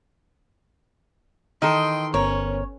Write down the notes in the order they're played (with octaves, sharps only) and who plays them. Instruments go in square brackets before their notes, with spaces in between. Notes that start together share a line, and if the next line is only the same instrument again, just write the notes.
[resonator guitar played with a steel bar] D#3 E3 A4 [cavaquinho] D#5 [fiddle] G5 C6
[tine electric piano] G1 B3 C5 [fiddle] C#4 [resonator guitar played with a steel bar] A#4 [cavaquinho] C#5